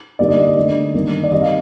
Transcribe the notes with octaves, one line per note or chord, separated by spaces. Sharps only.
D3 G3 A#3 D#4 D5
D#5
D5
D#5
D3 A3 D4
G2 D#3 A#3 D4
D5
D#3 G3 C4 D#5
F5